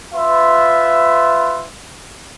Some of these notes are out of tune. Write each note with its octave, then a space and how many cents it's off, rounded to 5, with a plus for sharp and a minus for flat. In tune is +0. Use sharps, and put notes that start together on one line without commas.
F4 +0 B4 +25 E5 +0